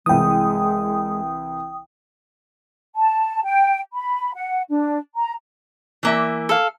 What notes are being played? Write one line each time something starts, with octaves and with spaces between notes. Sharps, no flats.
C2 E3 G#3 G5 D#6
A5
G5
B5
F#5
D4
A#5
E3 A#3 E5
A4 F5